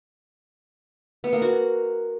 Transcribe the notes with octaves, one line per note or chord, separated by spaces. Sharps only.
B3
A#3
F#4